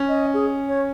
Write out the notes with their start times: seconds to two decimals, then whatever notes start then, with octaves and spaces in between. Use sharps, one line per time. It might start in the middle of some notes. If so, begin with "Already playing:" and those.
Already playing: C#4
0.08 D#5
0.34 G#4
0.68 C#5